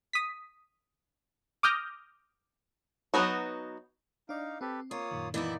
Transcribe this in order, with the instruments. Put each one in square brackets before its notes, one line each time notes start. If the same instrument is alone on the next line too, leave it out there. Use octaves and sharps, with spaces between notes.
[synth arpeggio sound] D#6 B6
D6 D#6 F6 G6 A#6
[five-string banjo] F#3 A3 B3 D#4 F#4
[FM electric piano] D4 D5 [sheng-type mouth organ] D#4 F5
[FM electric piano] C4 [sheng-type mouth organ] G4 A4 B4
[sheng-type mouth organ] A#3 C#5 D#6 [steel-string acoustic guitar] F4
[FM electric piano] F#2 A#2 D#3
[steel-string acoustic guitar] E3 B3 E4 [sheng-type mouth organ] A#3 D#4 D5